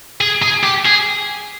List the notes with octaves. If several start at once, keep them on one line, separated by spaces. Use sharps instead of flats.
G#4
G#4
G4
G#4